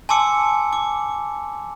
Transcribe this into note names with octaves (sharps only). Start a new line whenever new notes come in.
G#5 A5 C6 D6 E6 C#7
D6